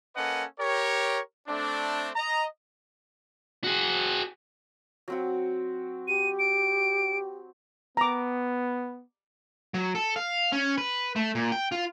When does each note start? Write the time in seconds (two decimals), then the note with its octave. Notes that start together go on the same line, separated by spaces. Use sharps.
0.16 A#3 C#4 A4 B4 D#5 F#5
0.59 G4 A#4 C#5
1.48 A3 C4 D4
2.16 D#5 A#5
3.64 F#4 G#4
5.08 F#3 C4 F#4
6.08 G4 D#7
6.39 D7
7.97 B3 A#5 D6
9.74 F#3
9.95 A4
10.16 F5
10.52 C#4
10.78 B4
11.16 A3
11.35 A#2
11.52 G5
11.72 F4